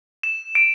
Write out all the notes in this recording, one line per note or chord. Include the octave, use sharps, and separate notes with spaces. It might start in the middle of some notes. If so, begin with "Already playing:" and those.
E7
D7